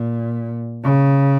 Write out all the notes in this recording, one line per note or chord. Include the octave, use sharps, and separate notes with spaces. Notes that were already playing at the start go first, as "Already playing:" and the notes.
Already playing: A#2
C#3